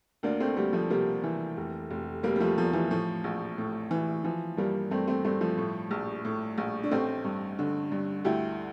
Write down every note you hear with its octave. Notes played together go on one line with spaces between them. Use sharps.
D2 A#3 D4
A3 C4
D2 G3 A#3
F3 A3
C3 G3 A#3
E3
F1
F1
F1 G3 A#3
G3
F3 A3
E2 F3
E3
A2 F3
A#1
A2
E3
E3 F3
G2 G3 A#3
G2 A3 C4
A3 C4
G2 A3 C4
F3 A3
A2
A#1
A2
A#1
D4
A1 A3 C4
G2
D3
G2
D2 E4 G4